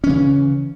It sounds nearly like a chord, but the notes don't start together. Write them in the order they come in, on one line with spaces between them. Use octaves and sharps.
C#4 E3 C#3